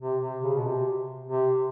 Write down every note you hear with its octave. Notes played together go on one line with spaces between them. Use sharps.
C3
C3
C#3
B2
C3
C3